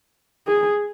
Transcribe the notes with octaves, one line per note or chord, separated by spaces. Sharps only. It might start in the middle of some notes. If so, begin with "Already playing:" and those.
G#4